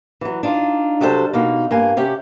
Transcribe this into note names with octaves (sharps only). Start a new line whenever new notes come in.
E3 F#3
D4 D#4 F4
C3 F#3 G3 E4 A4 C5
B2 A#3 D#4
G2 A#3 G#5
C3 C#4 G4 F#5